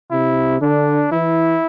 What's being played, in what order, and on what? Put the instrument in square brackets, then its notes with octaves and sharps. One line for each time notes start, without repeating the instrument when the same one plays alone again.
[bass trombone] C3 [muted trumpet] E4
[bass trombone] D3 [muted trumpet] D4
[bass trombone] E3 [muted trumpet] E4